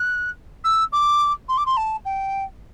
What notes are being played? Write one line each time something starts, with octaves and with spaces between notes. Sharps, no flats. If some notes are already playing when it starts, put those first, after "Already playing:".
Already playing: F#6
E6
D6
C6
D6
C6
A5
G5